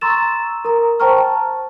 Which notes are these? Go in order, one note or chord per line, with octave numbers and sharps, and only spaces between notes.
A#5 C6 C#6 E6 A6 E7
A#4 A#5
C5 G5 A5 A#5 C#6 F6
A5